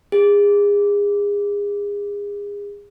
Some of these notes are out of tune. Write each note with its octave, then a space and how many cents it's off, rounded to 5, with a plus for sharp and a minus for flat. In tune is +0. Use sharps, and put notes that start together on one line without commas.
G#4 -30